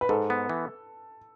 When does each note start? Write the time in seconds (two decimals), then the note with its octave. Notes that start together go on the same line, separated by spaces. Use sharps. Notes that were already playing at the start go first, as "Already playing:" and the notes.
0.01 B4
0.09 G#2 A4
0.30 B3
0.49 E3